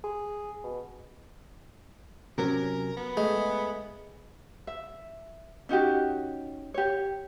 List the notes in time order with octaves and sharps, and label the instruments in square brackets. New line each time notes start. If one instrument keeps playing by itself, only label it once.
[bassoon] G#4
B2
[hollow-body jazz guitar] C3 F#3 C#4 [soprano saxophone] A#4
[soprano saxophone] B3
[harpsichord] G#3 [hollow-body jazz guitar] A3
[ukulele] E5
C#4 D#4 F#4 G4
G4 C#5